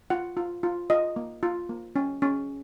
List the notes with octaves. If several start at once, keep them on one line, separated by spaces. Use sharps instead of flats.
F4 F#5
F4
F4
F4 D#5
A#3
F4
A#3
C#4
C#4